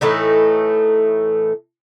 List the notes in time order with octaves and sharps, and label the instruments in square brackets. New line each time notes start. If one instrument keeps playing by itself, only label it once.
[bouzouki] A2 E3 A3 D#4